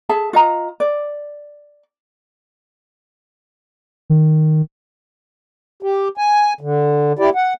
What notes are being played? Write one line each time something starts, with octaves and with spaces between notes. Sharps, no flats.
G#4 E5 A5
F4 D#5 A#5
D5
D#3
G4
G#5
D3
E4 G4 D5
F#5